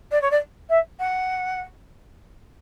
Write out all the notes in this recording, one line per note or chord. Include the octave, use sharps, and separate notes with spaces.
D5
C#5
D5
E5
F#5